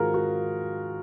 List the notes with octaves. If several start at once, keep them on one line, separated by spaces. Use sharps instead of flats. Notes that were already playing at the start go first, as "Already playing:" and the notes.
Already playing: G#2 D#3 G#3 C4 F4 F#4 G#4 A#4
F#4